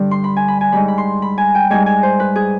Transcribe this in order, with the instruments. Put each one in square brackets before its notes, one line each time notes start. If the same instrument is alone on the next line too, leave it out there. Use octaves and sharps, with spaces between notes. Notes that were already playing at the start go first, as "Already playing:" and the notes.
Already playing: [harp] G2 D3 G3
C6
B5
G#5
B5
G#5
G#2 G3 B5
B5
C6
B5
G#5
G5
G#2 G3 G#5
G#5
C5
B4
G#4